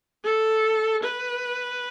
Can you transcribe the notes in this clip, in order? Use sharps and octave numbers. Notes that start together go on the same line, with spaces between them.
A4
B4